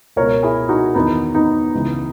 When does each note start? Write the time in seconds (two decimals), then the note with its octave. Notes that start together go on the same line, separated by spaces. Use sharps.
0.16 C#2 B2 A#4 C#5
0.43 E4 G#4
0.69 D#4 F#4
0.95 E2 D#3 B3 D#4
1.35 B3 D#4
1.74 C#2 C#3 E3